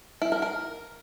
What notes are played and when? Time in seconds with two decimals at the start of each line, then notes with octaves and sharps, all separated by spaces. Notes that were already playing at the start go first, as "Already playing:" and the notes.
0.22 E4
0.32 A#4
0.42 A#4